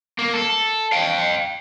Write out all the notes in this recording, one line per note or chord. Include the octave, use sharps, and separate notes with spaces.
A#3
A4
F5 G5